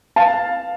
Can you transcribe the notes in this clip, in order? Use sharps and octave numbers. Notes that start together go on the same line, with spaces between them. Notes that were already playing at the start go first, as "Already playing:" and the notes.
F5 A5